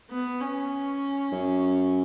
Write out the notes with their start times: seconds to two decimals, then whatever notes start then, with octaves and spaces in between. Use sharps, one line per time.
0.10 B3
0.41 C#4
1.32 F#2